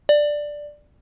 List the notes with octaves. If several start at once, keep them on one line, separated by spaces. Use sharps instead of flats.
D5